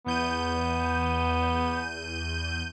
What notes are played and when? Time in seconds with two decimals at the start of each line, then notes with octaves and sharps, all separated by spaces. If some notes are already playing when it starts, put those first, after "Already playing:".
0.06 E2 B3 G6 D#7